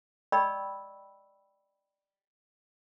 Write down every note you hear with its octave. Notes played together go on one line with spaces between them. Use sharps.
D5 D#5 G5 B5 C#6 E6